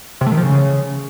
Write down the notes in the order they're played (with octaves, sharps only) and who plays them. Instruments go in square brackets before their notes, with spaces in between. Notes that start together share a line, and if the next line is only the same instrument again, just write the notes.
[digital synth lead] C3
A3
D#3
F3
C#3